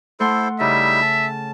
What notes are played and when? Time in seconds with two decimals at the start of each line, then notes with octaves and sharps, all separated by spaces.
0.20 A3 E4 A4 C5 F#5 C6
0.60 C#3 G3 D#4 E4 E5
1.02 A5